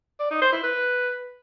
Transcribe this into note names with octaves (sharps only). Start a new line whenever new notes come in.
D5
D#4
C5
E4
B4